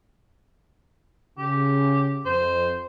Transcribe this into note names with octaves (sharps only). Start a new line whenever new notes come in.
C#3 G4
F2 C5